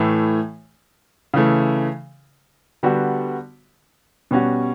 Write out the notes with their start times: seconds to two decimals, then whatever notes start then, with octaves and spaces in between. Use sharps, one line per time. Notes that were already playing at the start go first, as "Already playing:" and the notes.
Already playing: A2 E3 A3
1.34 C#3 E3 A3
2.83 D3 G3 B3 F#4
4.31 B2 G3 C#4 F#4